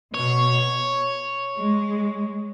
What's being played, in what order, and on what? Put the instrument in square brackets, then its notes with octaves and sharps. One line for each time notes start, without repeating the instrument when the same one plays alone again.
[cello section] B2 [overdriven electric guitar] C#5
[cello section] G#3